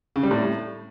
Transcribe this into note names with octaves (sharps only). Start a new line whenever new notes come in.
C#3
G3
A2